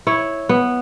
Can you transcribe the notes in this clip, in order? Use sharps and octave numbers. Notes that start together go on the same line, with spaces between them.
E4 C#5
B3